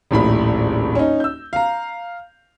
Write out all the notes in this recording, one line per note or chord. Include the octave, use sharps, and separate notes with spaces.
D#1 A#1 A2 B5
C#4 D#4
E6 G6
F5 A#5